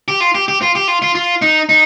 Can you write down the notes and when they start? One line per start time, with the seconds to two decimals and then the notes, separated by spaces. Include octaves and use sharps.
0.08 G4
0.20 F4
0.35 G4
0.48 G4
0.62 F4
0.75 G4
0.88 F4
1.02 F4
1.15 F4
1.42 D#4
1.69 D#4